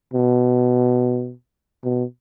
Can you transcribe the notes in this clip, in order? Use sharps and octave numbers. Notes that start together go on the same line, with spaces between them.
B2
B2